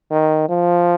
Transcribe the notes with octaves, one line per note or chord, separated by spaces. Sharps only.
D#3
F3